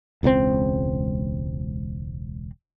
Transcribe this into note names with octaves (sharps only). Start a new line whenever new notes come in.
E1 C#2 C#3 C4